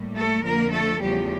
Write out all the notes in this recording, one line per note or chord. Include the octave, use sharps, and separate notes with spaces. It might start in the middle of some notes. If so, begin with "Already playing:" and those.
Already playing: A2 G3 A#3
A3 A4
F2 D3 F3 A#3 A#4
A3 A4
E2 C#3 F3 G3 A3 G4